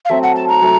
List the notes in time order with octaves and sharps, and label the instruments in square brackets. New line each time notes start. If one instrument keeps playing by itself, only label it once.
[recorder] F5
[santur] F#3 A3 C4 [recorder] E5
[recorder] F#5
A5
A#5
[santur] F#3 A3